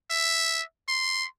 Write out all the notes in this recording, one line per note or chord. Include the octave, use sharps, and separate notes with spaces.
E5
C6